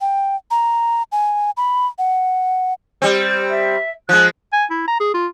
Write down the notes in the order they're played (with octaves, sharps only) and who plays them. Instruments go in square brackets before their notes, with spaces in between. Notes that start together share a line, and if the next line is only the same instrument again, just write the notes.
[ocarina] G5
A#5
G#5
B5
F#5
[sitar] G3 C4
[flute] E5
[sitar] F3 G#3 [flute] F#6
[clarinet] G#5
E4
A#5
G#4
F4